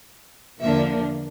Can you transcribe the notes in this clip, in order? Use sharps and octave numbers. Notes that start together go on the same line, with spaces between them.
E2 D3 F3 A#3 D4 E5